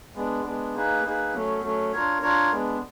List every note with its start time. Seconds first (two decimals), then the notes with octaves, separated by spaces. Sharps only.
0.15 G#3 B3 D4
0.45 G#3 B3 D4
0.74 A#3 D#4 G#4 B4
1.04 A#3 D#4 G#4 B4
1.33 F#3 A3 C#4
1.63 F#3 A3 C#4
1.93 D4 F4 A#4 C#5
2.22 D4 F4 A#4 C#5
2.51 G#3 B3 D4